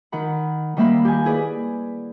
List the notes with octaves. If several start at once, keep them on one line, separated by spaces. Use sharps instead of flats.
D#3 F#5 B5
D#3 G3 A#3 E5 F5 B5
G4 G#5
E4 G#4 B4 D5